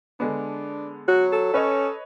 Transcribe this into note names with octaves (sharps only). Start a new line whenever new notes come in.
D3 G#3 B3 D4
F#3 F#4
A4
C#4 B4 C#5 D#5